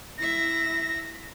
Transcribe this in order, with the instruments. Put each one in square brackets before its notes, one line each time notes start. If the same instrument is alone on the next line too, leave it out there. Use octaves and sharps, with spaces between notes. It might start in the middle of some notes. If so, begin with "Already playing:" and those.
[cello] E4 E5 [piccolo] A#6